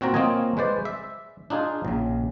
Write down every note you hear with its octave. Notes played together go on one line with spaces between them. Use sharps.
A#2 C4 F#4 A#5
A#3 C4 F4 C#5 D#5 G#5
G#3 B4 C5 D5
E5
D4 D#4 F4 G#4
A#1 C#3